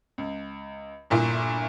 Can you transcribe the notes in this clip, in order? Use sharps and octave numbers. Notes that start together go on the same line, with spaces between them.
C#2
G1 A#2 E4